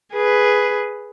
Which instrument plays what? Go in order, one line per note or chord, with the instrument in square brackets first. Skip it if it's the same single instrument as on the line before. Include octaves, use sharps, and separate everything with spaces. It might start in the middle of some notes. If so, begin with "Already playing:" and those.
[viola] G#4 B4